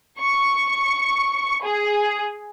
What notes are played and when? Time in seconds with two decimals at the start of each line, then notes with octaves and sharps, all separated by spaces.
0.19 C#6
1.63 G#4